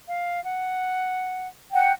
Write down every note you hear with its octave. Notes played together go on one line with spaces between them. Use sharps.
F5
F#5
F#5 G5